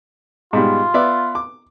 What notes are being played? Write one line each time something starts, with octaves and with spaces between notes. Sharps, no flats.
G#2 B2 G3 F4
B3 D5 E5
D6